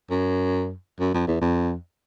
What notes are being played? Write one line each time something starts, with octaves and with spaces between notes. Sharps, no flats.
F#2
F#2
F2
E2
F2